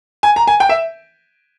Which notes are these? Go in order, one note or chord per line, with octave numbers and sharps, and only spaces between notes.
G#5
A#5
G#5
G5
E5